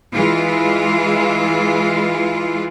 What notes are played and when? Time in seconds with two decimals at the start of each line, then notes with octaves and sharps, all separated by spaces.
0.15 E3 G#3 F4